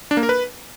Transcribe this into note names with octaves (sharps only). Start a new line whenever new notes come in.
D4
A#3
A#4
B4